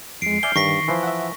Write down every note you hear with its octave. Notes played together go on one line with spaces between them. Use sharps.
F2 G#3 C7 D7
D5 E5 G#5 F6 G6 G7
G2 D#3 C#6 A#6 B6
E3 F3
E5 F#5